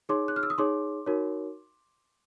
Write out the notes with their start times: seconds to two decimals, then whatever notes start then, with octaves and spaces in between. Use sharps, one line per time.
0.09 D#4 G#4 C#5 C6 D6
0.28 F#6
0.36 F6
0.43 E6
0.50 D#6
0.58 D#4 G#4 C#5 C6 D6
1.06 D#4 F#4 A#4 C#5